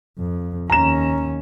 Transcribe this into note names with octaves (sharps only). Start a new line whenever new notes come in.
F2
D#2 C#4 A#5 E7